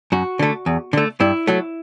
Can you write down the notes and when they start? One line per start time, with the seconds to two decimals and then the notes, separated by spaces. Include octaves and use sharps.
0.12 F#2 F#4
0.39 D3 A3
0.66 E2
0.93 D3 A3
1.20 G2 E4
1.47 F#3 A3